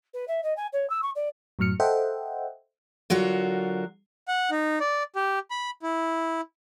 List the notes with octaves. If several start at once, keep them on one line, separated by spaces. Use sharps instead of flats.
B4
E5
D#5
G#5
C#5
E6
C#6
D5
F#2 A2 F#3 F6 C#7
A4 C5 D#5 E5 F#5 G5
D3 F#3 F4 F#4 A#4
F#5
D#4
D5
G4
B5
E4